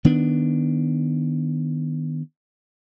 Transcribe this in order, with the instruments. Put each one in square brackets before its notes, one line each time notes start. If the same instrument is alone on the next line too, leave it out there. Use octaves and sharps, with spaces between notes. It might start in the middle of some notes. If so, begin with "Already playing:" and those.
[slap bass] D#3 B3 D4